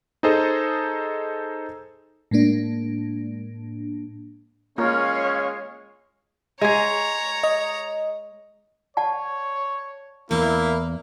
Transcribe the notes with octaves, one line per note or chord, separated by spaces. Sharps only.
D#4 G#4 A4 C5 D#5
A2 G#3 A#3 D4
G#3 A#3 C#4 F4 A#4 C#5 F5
G#3 G#4 C#5 A#5
D#5
C#5 D5 F#5 A5
E2 A#3 E4